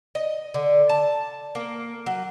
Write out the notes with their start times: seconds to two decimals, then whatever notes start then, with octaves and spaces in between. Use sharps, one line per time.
0.15 D#5
0.54 D3
0.89 A5
1.55 A#3
2.06 F#3